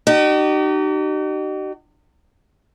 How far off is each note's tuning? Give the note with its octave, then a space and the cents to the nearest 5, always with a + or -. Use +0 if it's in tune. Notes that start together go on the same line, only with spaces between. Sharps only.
D#4 -35 G4 -45